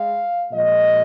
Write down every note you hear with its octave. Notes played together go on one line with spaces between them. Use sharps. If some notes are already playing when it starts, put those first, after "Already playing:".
Already playing: G#3 F5
A#2 F3 G#3 D#5